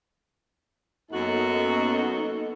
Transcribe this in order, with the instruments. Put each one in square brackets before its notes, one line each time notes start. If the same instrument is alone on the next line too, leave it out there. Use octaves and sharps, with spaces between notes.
[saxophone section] F#2 F#4 [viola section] A#3 B3 A4 [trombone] D#4